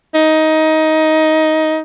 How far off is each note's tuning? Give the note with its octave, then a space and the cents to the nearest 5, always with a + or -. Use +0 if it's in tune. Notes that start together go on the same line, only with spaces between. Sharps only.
D#4 +15